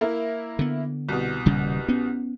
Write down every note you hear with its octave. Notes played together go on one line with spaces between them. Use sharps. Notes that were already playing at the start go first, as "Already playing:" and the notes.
A#3 E4 A#4
D3 B3
C2 B2
D#1 C#3 G3
B3 C#4